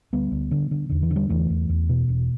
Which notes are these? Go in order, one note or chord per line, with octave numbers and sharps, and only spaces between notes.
D2 G3 B3
D2
D3
D3
E2 D3
E3
D3
G3
E2 E3 A3
E2
E2
B2
E1